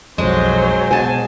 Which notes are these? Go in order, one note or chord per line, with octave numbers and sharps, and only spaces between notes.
B1 F2 F#3 G#3 C5
B2 G#5 A5